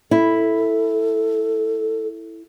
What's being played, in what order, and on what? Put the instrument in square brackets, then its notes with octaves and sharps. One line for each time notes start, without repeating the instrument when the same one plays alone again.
[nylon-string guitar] E4 [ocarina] A4